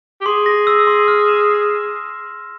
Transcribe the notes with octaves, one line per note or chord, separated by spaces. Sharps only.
G4
G#4 C6
A#6
E6
C6
F6
E7
C7